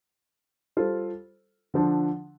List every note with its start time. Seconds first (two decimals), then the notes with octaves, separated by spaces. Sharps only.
0.77 G3 F4 A4 C5
1.74 D3 F3 D4